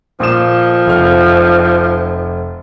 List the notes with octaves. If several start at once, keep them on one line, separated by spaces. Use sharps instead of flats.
A#2 F3 D#6 E7
F1 F6